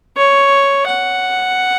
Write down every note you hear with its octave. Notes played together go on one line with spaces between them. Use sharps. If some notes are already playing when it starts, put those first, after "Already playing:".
C#5
F#5